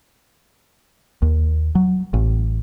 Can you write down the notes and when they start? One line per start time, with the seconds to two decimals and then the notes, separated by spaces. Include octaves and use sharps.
1.22 D#2
1.75 F#3
2.14 A1